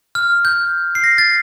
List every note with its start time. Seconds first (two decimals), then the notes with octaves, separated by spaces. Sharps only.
0.15 F6
0.45 G6
0.95 C7
1.04 A#6
1.18 A6